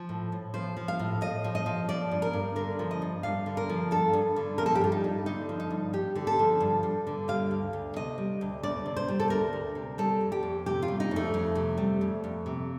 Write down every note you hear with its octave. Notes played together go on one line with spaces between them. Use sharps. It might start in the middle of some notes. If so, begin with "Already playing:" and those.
Already playing: F3
A2
A2
F3 C5
F3
F5
A2
A2 D#5
F3
D#5
F3
F3 D5
G2
A#4
G2
D3 A#4
F3
D#5
G2
G2 F5
D3
A#4
F3
G2 A4
G2
D3
F3 A#4
A4
G4
G2 F4
D#4
G2
D3 D#4
F3
D#4
G2
G2 G4
D3
A4
F3
G2
G2
D3
G3 F5
D2
D2
C3 D#5
G3
D2
D2 D5
C3
C5
G3
A4
D2 A#4
D2
C3
G3 A4
F2
G4
F2
C3 G4
F4
G3
D#4
F2 A3
F2
C3
G3
F2
F2
C3